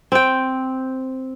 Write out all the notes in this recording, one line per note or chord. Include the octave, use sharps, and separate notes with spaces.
C4 G5